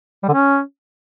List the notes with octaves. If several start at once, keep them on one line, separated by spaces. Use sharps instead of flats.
G3
D3
C#4